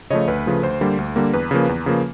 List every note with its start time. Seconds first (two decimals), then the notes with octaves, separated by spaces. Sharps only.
0.10 C#3 F3 A3 C#5 D#5
0.28 D2 B4
0.46 C#3 F3 A3
0.63 D2 C5
0.81 D3 G3 A#3
0.98 D2
1.16 D3 G3 A#3
1.34 E2 B4
1.51 C#3 F3 A#3
1.69 E2
1.86 C#3 F3 A#3